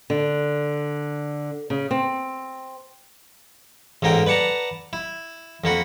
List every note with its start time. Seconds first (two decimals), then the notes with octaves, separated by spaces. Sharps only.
0.10 D3
1.70 C#3
1.91 C4
4.02 A1 G#2 A#3 A#4 G5
4.27 B4 D5 F#5 A5 A#5
4.93 E4
5.64 F2 A#3 F#4 B5